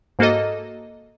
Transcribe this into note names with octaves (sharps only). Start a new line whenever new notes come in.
G#2 A#3 F#4 A4 D#5